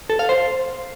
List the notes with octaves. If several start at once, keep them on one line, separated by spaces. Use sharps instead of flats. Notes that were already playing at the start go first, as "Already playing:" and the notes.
A4
F5
C5